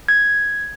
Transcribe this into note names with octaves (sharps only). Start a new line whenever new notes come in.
G#6